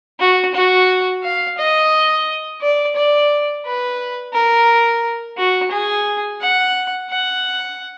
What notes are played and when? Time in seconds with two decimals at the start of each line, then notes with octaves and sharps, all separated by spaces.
0.20 F#4
0.54 F#4
1.23 F5
1.58 D#5
2.61 D5
2.96 D5
3.65 B4
4.33 A#4
5.37 F#4
5.71 G#4
6.41 F#5
7.10 F#5